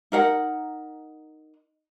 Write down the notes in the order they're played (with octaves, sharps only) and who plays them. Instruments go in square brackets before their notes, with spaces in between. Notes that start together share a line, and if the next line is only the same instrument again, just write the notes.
[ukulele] D#4 A#4 F#5